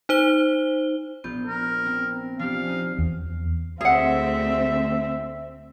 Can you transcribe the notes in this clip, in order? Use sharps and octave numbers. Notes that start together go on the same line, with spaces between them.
D#4 C5 G7
A#1 B3 F4 G6
A#4
C4
F3 D4 F4 G4 F5
C#4 D#4
E2
D2 C4 G#4 E5 F#5